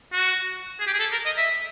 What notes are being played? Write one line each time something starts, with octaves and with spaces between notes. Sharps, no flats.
F#4
G#4
G4
G#4
A4
A#4
D#5
E5